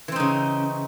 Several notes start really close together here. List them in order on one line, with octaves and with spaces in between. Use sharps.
E3 C4 D#4 C#3